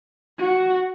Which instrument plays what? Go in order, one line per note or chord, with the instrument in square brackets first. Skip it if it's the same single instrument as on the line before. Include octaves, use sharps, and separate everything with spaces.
[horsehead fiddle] F#4